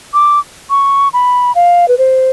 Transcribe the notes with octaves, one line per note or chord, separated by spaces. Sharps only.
D6
C#6
B5
F5
B4
C5